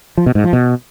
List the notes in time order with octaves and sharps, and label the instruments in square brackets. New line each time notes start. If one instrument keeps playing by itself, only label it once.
[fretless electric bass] F3
B2
G#2
F3
B2